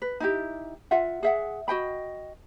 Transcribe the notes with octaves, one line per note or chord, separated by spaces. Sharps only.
B4
D#4 E4 G4
F4 E5 F#5
G#4 E5 F#5
F#4 D#5 G5 B5